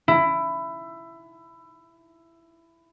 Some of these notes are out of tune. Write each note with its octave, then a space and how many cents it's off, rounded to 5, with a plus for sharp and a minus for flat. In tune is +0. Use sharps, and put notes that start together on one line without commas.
E4 +15